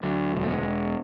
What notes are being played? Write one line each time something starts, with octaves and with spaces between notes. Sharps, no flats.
D2 F#3 A3
E1
A3
G#3 B3